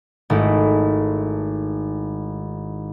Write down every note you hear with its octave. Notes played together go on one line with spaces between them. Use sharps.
G#1 A3 E4